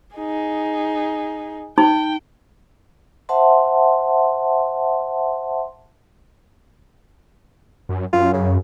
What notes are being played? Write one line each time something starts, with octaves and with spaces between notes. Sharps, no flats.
D#4 G#4
D#4 G5
C5 E5 F#5 A5 C6
F#2
F#2 F4
C#3